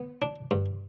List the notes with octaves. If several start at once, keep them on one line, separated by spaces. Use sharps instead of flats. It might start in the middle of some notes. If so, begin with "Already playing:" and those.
Already playing: B3
D4
G2